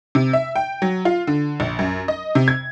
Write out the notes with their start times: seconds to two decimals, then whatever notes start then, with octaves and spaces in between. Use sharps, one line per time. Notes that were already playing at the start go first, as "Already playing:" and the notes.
0.15 C3
0.33 E5
0.56 G5
0.82 F#3
1.05 F4
1.27 D3
1.60 A#1
1.79 F#2
2.08 D#5
2.35 C3
2.48 G#6